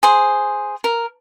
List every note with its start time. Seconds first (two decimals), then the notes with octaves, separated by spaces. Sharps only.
0.03 G#4 C5
0.84 A#4